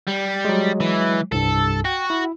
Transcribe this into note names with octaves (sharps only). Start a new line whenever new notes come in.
G3
F#3 G#3
E3
C2 G2 A4
F#4 G5
E4